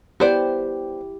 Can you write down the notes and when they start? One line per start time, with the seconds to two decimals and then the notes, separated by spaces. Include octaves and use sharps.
0.20 B3 E4 G4 C5 D5